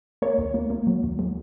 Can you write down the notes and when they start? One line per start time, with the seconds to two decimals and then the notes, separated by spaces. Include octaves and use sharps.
0.22 A#3 C#5
0.38 D#2
0.54 A#3
0.70 A#3
0.87 F#3
1.03 D#2
1.19 F#3